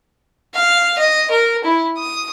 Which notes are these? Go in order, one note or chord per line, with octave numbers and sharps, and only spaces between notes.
F5
D#5
A#4
E4
D#6